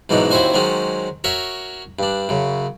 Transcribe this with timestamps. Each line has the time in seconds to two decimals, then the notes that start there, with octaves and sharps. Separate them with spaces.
0.09 G#2 B2 E3 F#3 D4 D#4
0.31 D#2 C4 E4 F#4 C5 G#5
0.54 D#3 F#3 G#3 C4 C#4
1.24 F#4 A#4 C#5 E5
1.99 G2 D4
2.29 F#2 C#3